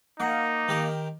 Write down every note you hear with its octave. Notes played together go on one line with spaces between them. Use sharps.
A#3 D#4 F#5
D#3 G4 A#4